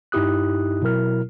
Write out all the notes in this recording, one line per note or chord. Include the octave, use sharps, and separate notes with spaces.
G2 D#4 E4 G4 D#6 F#6
B2 F#3 E4 A#4 F6